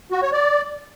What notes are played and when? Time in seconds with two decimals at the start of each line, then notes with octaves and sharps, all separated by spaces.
0.12 F#4
0.22 C#5
0.33 D5